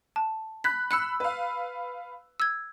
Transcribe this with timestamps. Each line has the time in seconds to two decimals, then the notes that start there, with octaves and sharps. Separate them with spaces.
0.16 A5
0.64 B5 F#6 B6
0.91 B5 E6 F#6 C#7
1.20 B4 F5
2.40 E6 G#6